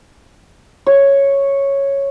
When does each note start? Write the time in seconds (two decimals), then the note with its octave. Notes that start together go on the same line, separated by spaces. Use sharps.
0.86 C#5